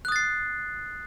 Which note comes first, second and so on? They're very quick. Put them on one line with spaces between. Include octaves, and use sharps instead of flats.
F#6 D#6 A6 C7